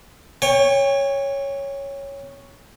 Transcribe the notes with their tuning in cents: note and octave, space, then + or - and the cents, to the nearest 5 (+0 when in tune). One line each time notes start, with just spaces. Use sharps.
C#5 +0 G5 +40